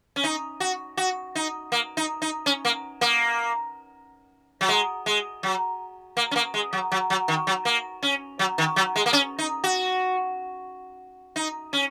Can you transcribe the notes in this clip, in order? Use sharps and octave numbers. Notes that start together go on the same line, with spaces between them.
C#4
D#4
F#4
F#4
D#4
A#3
D#4
D#4
C#4
A#3
A#3
F#3
G#3
G#3
F#3
A#3
C#4
A#3
G#3
F#3
F#3
F#3
D#3
F#3
A#3
C#4
F#3
D#3
F#3
G#3
A#3
C#4
D#4
F#4
D#4
C#4